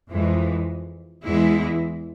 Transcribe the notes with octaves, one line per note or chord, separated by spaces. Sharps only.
F2 E3 G#3
E2 E3 G#3 E4